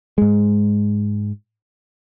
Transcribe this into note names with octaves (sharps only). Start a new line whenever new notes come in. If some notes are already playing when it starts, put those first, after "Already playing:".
G#2 G#3